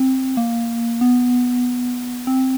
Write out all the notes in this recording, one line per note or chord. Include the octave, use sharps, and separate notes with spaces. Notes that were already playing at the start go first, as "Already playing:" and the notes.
Already playing: C4
A#3
B3
C4